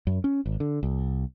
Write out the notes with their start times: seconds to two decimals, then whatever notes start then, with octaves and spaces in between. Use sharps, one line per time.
0.07 F#2
0.24 C#4
0.46 G#1
0.60 D3
0.83 C2